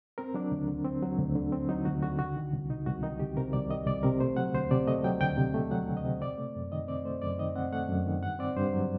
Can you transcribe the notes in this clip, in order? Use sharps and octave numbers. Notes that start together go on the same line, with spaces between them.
C4 A#4
F#3 D4
D2
D3
C4
F#3
D2
D3
C4
F#3 D#4
D2 F#4
D3 F#4
C2 F#4
D#3
C2
C3 D#4
C2 F#4
D#3 D#4
C2 G4
C3 A#4
C2 D5
D#3 D#5
C2 D5
C3 A#4
A3 C5
F#3 F#5
D2 C5
C3 D5
A3 D#5
F#3 G5
D2 G5
C3
A3
F#3 F#5
D2
D#5
C3
C4 D5
A3
F#2
D#3 D#5
C4 D5
A3 C5
F#2 D5
D#3 D#5
C4 F#5
A3 F#5
F#2
D#3
G2 F#5
C4 D5
G2 C5
F#3